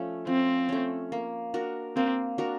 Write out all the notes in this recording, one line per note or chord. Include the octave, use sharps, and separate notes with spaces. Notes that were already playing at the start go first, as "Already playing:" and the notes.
Already playing: F3 A3 C#4
F3 C4
A3 C#4
A#3
D4 F#4 A#4
A#3 C4
D4 F#4 A#4